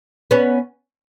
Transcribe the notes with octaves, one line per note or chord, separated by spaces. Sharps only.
B3 C#4